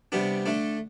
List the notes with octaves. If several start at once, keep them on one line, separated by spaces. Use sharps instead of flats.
C3 G3 B3 D4
D3 A3 D4